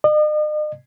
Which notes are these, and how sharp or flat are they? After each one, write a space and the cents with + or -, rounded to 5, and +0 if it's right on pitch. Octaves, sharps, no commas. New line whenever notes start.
D#5 -45